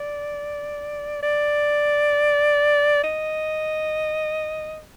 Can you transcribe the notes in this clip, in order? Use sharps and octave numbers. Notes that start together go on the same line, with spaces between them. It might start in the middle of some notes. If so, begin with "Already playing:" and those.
Already playing: D5
D5
D#5